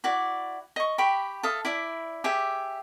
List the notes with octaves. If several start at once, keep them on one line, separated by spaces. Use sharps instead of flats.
E4 F#4 D5
D#5 C#6
G4 G5 B5 C#6
A4 E5 F5 D#6
E4 D5 E5
G4 G#4 E5